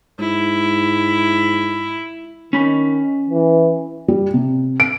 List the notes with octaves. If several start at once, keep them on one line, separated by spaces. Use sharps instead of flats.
G#2 E4
D#3 C#4 B5
E3
G3
C3
D7